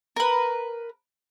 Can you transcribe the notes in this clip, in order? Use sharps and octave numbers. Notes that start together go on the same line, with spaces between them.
A#4 B4